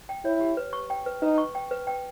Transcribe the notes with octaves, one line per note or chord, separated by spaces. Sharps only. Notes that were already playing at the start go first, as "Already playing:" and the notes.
G5
E4 C#5
G4
B4
C#6
G5
B4
D#4 B4
C#6
G5
B4
G5